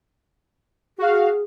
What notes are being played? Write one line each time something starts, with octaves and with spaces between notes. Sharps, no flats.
F#4 G#4 F5